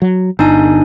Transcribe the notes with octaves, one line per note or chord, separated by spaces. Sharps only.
F#3
G1 D4 D#4 G#5